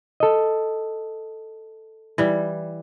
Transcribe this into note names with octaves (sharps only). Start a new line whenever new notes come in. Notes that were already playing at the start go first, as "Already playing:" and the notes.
A4 D#5
E3 G3